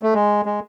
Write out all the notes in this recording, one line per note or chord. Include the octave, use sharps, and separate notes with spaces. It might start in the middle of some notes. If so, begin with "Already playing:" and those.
A3
G#3
G#3